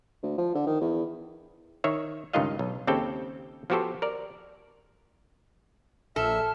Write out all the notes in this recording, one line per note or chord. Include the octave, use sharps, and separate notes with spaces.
D2
F3
D3
D#3
E2
D#3 C#5 E5
C#2 G2 D#3 F4 D#5 F5
B1
D#2 C#3 C4 G4 A4 G5
F3 B3 F#4 G4 A4 C5
A#4 D5
A#1 A4 E5 A5 F6